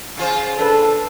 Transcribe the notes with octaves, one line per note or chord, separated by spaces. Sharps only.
C#3 F4 C5
D4 A4 B4